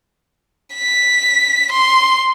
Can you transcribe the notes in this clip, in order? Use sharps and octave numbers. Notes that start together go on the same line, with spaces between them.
B6
C6